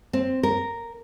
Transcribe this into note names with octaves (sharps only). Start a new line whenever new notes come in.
C4
A#4